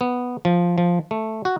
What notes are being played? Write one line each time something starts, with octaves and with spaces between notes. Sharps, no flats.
B3
F3
F3
A3
F#4